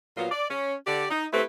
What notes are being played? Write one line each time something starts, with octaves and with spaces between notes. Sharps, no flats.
A#2 F#3 B3 F4
D5
C#4
D3 G4 D5
D#4
A3 C4 E4 G4 B4